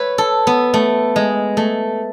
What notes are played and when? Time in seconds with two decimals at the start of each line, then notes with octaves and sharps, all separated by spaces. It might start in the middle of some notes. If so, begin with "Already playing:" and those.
Already playing: B4 C#5 E5
0.18 A4
0.47 B3
0.74 A3
1.16 G#3
1.57 A3